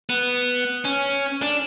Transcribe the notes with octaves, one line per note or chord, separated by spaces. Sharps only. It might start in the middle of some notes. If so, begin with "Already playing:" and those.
B3
C#4
D4